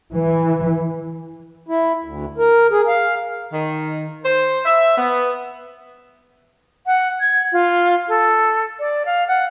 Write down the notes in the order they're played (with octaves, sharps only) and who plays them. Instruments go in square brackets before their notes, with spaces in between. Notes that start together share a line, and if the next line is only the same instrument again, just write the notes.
[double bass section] E3
[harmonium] E4
D2
A#4
G#4
F5
[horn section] D#3
C5
E5
B3
[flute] F#5
G#6
F4
A4
D5
F5
F#5